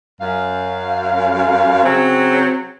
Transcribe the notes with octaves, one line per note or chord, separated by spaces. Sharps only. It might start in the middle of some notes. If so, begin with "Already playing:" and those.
F#2 F5
C#3 F#3 C4